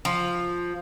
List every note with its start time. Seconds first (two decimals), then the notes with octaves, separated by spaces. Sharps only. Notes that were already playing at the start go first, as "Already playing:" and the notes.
0.05 F3